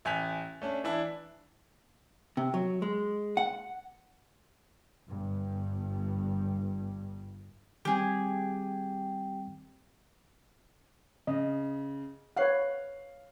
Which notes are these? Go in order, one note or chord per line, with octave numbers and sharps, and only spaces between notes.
A1 G#5 F#6 G6 B6 F7
A3 C#4 D4
E3 D4 E4
C3
F#3
G#3
F#5
G1 G2
D#3 G3 C4 G4 G#4
C#3 D#5
B4 C#5 F5 F#5 F#6 C7